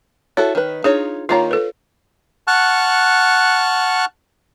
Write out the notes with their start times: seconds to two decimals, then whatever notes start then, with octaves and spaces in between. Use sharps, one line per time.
0.37 E4 F#4 A4 C#5
0.55 D#3 B4
0.84 D4 D#4 F4 G#4 C#5
1.29 D#3 A#3 F4 C#5 F5 A#5
1.51 A4 B4
2.47 F#5 A5 C#6 F6 F#6